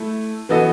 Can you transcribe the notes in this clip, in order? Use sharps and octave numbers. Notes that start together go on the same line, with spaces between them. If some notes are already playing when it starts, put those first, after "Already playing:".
Already playing: A3 E4 A4
E3 B3 F#4 A4 D#5